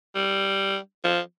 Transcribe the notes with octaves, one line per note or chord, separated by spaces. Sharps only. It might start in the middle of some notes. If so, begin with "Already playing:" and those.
G3
F3